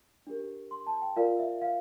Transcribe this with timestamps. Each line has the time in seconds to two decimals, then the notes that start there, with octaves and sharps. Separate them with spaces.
0.27 D4 G4 A#4
0.71 C6
0.87 A5
1.02 G5
1.16 F4 A#4 D5 F5
1.39 E5
1.61 F5